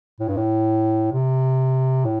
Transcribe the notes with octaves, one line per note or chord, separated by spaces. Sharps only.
A2
G2
A2
C3
A2